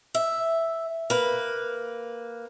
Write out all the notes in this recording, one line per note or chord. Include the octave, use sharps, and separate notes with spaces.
E5
A#3 B4